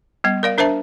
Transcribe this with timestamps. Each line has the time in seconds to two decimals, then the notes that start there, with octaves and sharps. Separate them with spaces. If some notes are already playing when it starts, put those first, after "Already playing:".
0.24 G3 B3
0.43 A#4 D5 F5
0.58 D4 A#4 C5 E5 A5